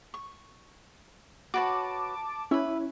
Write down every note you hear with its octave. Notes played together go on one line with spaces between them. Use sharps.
C#6
F#4 B4 C#5 A5 D6
C#4 E4 B4 E5